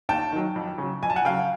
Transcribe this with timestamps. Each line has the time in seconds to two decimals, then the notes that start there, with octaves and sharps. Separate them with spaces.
0.09 D#2 G5 A5
0.32 D#3 F#3
0.56 F2
0.78 C#3 F#3
1.03 F2 G#5
1.10 A5
1.16 F#5 G#5
1.25 C#3 F#3 F5 G5